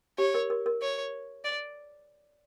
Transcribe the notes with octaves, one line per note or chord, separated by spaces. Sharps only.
G4 C#5
A#4
A#4
A#4
C#5
D5